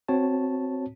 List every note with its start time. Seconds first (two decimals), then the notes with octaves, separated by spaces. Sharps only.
0.08 C4 F#4 C#5 A5